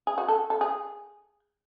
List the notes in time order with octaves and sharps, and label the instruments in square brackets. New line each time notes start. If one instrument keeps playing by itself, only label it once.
[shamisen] G#4
F#4
A4
A4
G#4